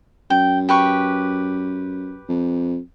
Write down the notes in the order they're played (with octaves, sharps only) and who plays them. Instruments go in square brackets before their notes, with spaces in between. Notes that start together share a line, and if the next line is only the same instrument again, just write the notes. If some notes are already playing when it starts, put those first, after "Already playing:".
[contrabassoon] F#2 [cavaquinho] G5
[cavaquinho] G4 B4 C#6
[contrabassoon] F2